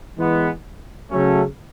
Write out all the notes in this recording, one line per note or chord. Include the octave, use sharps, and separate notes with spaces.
E3 G#3 B3
C#3 F#3 A3 C#4